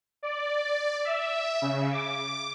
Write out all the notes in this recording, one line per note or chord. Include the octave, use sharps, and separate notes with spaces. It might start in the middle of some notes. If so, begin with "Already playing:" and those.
D5
E5
C#3
D6